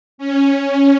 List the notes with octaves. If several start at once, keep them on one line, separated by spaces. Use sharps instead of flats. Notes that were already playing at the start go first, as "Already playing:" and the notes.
C#4